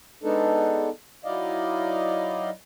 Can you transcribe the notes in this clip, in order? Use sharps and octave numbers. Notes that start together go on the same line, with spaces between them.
G#3 B3 D4 D#4 A4
F#3 D#4 E4 D5 D#5 F5